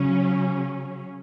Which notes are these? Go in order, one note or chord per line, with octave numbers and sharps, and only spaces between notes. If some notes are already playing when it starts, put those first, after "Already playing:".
Already playing: C#3 F#3 C#4